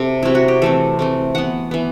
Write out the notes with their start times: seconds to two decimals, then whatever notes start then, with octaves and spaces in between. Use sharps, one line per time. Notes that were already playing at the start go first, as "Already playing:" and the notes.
Already playing: C3 C4 G4 A4
0.23 C3 F#3 C4 E4
0.35 F#4
0.48 G4
0.62 E3 A3 C4 A4
0.99 E3 A3 C4
1.35 E3 B3 F#5
1.71 E3 B3